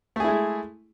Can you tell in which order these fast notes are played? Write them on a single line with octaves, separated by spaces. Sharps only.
A3 G#4 E4 G#3